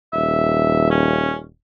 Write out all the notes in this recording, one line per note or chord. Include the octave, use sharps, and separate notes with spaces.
D#1 E5
C#4